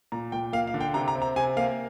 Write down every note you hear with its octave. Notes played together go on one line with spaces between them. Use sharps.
A#2 A#5
A#2 G5
A#3 F5
F5
D3
G5
C3 A#5
A#5
C4
A#5
C3 G#5
A#3 F5